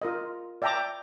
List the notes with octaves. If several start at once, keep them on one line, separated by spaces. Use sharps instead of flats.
F4 A#4 D#5
D5 E5 G5 A5 A#5 D6